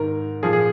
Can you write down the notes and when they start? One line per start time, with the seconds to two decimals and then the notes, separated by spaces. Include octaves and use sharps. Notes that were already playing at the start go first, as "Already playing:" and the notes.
Already playing: G#2 D#3 A#4
0.43 A#2 F3 G#4
0.53 G#4